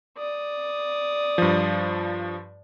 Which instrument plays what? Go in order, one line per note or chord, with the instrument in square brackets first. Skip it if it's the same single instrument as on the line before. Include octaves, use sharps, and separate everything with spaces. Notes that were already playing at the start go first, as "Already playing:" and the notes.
[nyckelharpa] D5 D#6
[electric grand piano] G2 F3